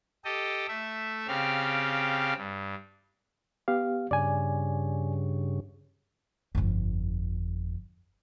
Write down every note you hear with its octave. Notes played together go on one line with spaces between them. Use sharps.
G4 A4 D#5
A3 E5
C#3 C4 G4 F5
G2
B3 G4 F5
G2 C#3 D5 G#5
G1 F2